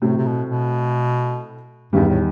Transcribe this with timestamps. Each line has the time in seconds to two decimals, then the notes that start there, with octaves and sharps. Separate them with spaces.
0.02 A2 C3 F#3 A3 C4
0.17 C3
0.26 B2
0.49 B2
1.93 E2 G2 D#3 G3
2.08 A2